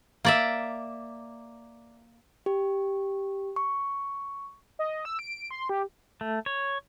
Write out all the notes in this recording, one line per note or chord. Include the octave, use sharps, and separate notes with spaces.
A#3 D5 E5
G4
C#6
D#5
E6
D7
C6
G4
A3
C#5